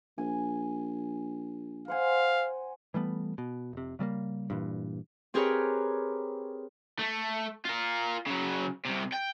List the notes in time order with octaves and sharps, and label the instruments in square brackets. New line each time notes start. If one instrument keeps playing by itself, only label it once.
[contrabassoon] A#1 [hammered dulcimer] G#5
[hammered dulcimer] C5 F#5 G#5 [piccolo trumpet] F5
[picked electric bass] E3 G3 A3 B3
B2
F1 C3
C#3 G3 A3 A#3
G2 A#2 E3
[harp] C4 G4 G#4 A#4 B4 C#5
[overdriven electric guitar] A3
F4 A#4
C#3 F#3
C2 C3
G5